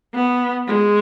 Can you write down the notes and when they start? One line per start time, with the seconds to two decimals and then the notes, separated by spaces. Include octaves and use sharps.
0.14 B3
0.67 G#3